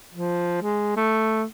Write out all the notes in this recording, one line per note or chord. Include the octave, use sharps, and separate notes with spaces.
F3
G#3
A3